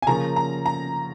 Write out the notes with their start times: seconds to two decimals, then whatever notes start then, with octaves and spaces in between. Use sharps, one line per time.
0.02 G#5
0.07 C#3 F3 A#3 C#4 A#5
0.36 A#5
0.66 A#5